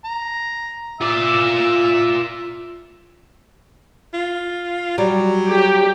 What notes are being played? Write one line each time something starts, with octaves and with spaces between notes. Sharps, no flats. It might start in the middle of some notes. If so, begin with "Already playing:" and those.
A#5
F4 D5 E5 E6
F4
F#3 G3
G4